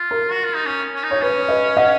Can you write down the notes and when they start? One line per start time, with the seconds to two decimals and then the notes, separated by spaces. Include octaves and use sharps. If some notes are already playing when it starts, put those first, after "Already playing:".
Already playing: F4
0.11 A#4
0.32 F#4
0.44 F4
0.55 D#4
0.66 C#4
0.95 C#4
1.03 D#4
1.11 C#5
1.21 C#4 B4
1.48 B4 D#5
1.77 D#5 F#5